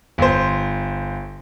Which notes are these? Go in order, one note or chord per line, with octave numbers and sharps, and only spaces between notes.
G1 C5